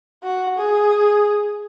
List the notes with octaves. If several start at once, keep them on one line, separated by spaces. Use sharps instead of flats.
F#4
G#4